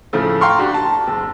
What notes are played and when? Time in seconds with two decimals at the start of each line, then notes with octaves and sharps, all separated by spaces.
0.13 A2 C#3 F3 A3
0.41 F5 G5 A#5 C6 C#6 F6
0.58 D4 F#4 G4
0.74 A5
1.07 F#1 E6